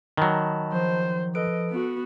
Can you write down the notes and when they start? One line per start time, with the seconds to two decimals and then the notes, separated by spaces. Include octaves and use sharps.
0.17 D#3 F#3 D#5 A5 B5
0.73 F3 C5
1.35 A4 B4 D#5 D7
1.70 B3 F#4